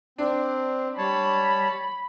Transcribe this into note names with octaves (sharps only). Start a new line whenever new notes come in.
C4 D4
G3 C#5 A5 B5